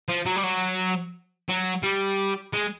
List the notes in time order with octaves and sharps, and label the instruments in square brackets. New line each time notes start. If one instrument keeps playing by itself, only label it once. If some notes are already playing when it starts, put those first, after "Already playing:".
[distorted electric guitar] F3
F#3
G3
F#3
F#3
G3
G#3